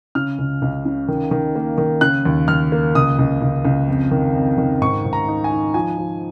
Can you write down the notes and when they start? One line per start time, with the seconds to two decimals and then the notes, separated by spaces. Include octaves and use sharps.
0.15 C#3 F6
0.38 C#2
0.62 C#2
0.85 C#3
1.08 D#3
1.31 D#3
1.55 A#3
1.78 D#3
2.01 C#3 F#6
2.25 D#2
2.48 D#2 F6
2.72 A#3
2.95 C#2 D#6
3.19 C#2
3.42 C#2
3.65 C#2
3.88 F2
4.11 D#3
4.34 F2
4.58 D#3
4.81 G#2 C#6
5.05 G#2
5.13 A#5
5.28 D#4
5.44 G#5
5.51 D#4
5.74 F3 G#5
5.98 F3